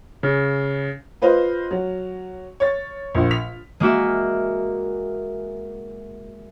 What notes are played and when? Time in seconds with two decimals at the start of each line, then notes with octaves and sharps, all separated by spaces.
0.23 C#3
1.22 F4 B4 C5 D#5 F5
1.71 F#3
2.60 C#5 A6
3.14 A#1
3.31 B6 F7
3.80 G#3 A#3 F#4 E5